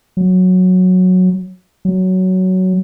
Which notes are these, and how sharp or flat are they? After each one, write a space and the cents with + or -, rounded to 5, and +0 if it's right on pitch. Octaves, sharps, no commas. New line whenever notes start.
F#3 -10
F#3 +10